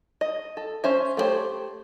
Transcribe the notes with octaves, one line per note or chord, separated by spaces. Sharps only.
D#5
A4
C#4 C5 E5
A3 B3 G4 C5 C#5